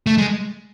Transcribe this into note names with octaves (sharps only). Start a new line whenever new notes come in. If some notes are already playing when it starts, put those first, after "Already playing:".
A3
G#3